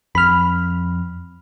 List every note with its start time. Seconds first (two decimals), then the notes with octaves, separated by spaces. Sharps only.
0.15 F2 B5 F6